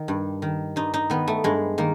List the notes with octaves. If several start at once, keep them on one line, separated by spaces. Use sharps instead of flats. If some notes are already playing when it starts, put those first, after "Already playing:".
Already playing: D#3
G2
D#3
G2 D#4
D#4
D#3 B3
A3
G2 G#3
D#3 A#3